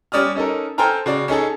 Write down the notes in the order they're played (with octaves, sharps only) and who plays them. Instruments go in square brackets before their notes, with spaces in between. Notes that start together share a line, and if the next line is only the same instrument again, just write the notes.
[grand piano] G3 C#4 D5 D#6 F6
C#4 D#4 A4 A#4
A4 C5 G5 G#5 A#5 F6
C#3 F#4 D5
C#4 D#4 G#4 A4